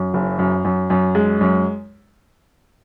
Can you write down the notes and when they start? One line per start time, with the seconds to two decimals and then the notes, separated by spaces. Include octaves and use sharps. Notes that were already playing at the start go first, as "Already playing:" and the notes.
Already playing: F#2
0.14 F#1
0.39 F#2
0.64 F#2
0.90 F#2
1.15 G#3
1.41 F#2